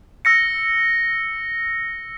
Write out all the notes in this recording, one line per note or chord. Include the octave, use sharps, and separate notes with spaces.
E6 A#6 C#7